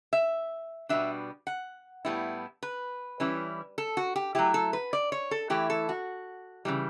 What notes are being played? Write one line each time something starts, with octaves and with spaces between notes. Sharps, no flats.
E5
B2 G3 B3 D4 E5
F#5
A2 G3 B3 E4
B4
E3 G3 C#4 E4
A4
F#4
G4
F#3 A3 E4 G4
A4
B4
D5
C#5
A4
E3 A3 E4 G4
A4
F#4
C#3 E3 G3